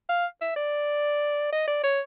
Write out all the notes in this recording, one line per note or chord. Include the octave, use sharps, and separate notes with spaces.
F5
E5
D5
D#5
D5
C#5